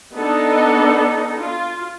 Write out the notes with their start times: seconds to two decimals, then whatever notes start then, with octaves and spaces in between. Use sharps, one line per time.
0.16 B3 D4 D#4 A4 D#5
1.40 F4